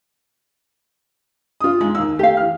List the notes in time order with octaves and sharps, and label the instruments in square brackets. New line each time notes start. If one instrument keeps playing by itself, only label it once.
[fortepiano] F4 D#6
[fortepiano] G#3 [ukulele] D#4
[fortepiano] D#2 F5 E6 [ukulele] D#4
[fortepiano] A3 [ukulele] G4 F5
[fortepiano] E3 F6